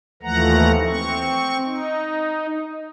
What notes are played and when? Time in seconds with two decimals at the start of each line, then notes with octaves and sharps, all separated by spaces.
0.23 D#2 E3 F3 A3 F#5 A#5
0.87 C4 C#6
1.65 D#4